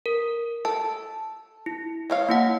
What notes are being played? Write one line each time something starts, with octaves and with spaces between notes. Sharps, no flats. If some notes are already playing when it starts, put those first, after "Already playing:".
A#4
A4 A5
E4
G#3 C#5 F5
A#3 E4 F#5